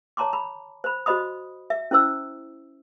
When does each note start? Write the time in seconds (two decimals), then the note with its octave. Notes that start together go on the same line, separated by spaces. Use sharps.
0.17 C#5 A5 A#5 C6 D6
0.33 B5
0.84 C5 B5
1.06 F#4 C5 D#5 B5 D#6
1.70 E5
1.91 C#4 E4 C5 E6